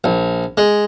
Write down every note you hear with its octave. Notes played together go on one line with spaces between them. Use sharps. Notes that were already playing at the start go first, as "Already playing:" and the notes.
A#1
G#3